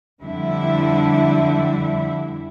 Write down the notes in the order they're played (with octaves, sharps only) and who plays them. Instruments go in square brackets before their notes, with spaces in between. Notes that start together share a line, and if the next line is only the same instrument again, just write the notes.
[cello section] F2 D3 G3 E4